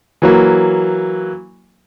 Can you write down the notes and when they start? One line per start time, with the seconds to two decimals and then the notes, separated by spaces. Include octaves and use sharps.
0.22 E3 F#3 A#3